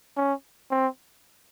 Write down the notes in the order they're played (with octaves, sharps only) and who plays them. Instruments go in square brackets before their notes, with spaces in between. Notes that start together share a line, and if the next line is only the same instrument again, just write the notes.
[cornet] C#4
C4